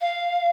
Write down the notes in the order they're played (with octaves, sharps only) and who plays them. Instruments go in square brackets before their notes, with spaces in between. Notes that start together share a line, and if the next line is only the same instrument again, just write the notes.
[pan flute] F5